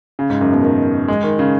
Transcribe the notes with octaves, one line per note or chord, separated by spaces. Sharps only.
C#3
G#2
F#2
B2
D#3
G#3
D#3
C#3